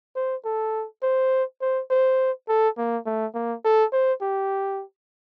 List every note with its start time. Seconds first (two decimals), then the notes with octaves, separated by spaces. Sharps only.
0.16 C5
0.45 A4
1.03 C5
1.61 C5
1.91 C5
2.48 A4
2.78 A#3
3.06 A3
3.35 A#3
3.65 A4
3.93 C5
4.22 G4